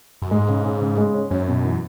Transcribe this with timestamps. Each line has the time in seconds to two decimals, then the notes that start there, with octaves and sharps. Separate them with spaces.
0.22 F#2
0.31 G#2 G#3
0.49 C#3
0.64 C#3
0.81 C#3
0.97 G#3
1.14 C#4
1.30 F#2 C#4
1.48 B2
1.64 E3